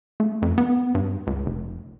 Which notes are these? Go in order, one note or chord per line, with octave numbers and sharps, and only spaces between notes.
A3
F2
B3
G2
C#2
F1